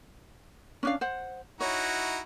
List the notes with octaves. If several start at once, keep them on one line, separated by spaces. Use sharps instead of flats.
C#4 D4 F5
C5 F#5
D#4 E4 F#4 C#5